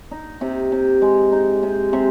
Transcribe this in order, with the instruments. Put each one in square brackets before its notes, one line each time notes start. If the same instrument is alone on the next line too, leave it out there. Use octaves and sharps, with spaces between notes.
[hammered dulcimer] D#4
C3
C3
G#3
D#4
C3
C3